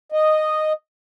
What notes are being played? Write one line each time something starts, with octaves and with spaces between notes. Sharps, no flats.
D#5